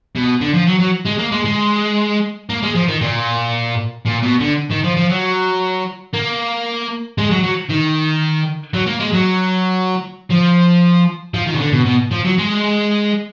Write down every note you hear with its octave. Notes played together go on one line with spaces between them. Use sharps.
B2
D3
F3
F#3
F#3
G#3
A#3
G#3
G#3
A#3
G#3
F3
D#3
A#2
A#2
B2
D3
D#3
F3
F3
F#3
A#3
G#3
F#3
F#3
D#3
F#3
A#3
G#3
F#3
F3
F3
D#3
B2
D3
B2
B2
F3
F#3
G#3